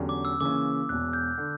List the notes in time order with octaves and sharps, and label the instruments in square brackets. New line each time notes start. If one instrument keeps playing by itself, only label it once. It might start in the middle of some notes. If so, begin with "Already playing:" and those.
Already playing: [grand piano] E2 D3 F#3 C#4 G4
[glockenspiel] D6
E6
[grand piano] C#3 E3 A#3 C#4 [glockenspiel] D6
[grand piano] E1 E2 B2 [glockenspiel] F#6
[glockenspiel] G6
[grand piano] D3